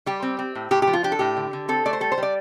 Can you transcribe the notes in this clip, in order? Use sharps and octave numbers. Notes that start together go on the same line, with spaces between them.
G3 G4
C4
C4
A2
A2 G4
G4
F3
F4
D4 G4
A4
A2 G4
D3
D3
C4 A4
A3 D5
C5
G3 A4
C5
G3 D5